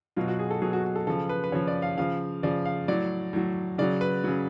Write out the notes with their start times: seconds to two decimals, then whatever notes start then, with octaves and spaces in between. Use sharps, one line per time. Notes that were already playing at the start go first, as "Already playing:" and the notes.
0.16 B2 F#3 F4
0.28 F#4
0.39 G#4
0.51 A4
0.62 B2 F#3 G#4
0.73 F#4
0.85 F#4
0.96 A4
1.07 C#3 F3 A4
1.29 B4
1.44 B4
1.52 C#3 F3 C#5
1.67 D5
1.82 F5
1.97 C#3 F3 F5
2.43 C#3 F3 D5
2.65 F5
2.88 A2 F#3 D5
3.33 A2 F#3
3.78 C#3 F#3 D5
4.01 B4
4.24 C#3 F#3